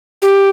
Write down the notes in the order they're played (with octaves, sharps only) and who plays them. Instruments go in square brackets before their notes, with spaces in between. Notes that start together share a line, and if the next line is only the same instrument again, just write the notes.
[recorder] G4